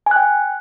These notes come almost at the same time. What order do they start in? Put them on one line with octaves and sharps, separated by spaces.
G#5 F#6 G5